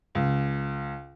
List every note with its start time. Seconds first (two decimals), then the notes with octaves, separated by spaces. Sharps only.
0.15 C#2